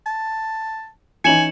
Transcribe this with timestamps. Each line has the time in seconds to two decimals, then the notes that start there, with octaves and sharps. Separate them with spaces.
0.06 A5
1.24 E3 C#4 D#4 G#5 C#7 E7 F#7